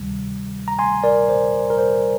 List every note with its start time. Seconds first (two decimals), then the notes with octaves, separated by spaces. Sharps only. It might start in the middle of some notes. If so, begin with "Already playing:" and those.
Already playing: D2 C3 D#3 G3
0.68 A#5
0.79 G#5 C6
1.03 A#4 D5
1.29 C5
1.70 A#4
1.78 C5